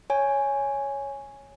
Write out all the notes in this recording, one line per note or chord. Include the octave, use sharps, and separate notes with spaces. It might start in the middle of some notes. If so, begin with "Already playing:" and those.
C#5 G#5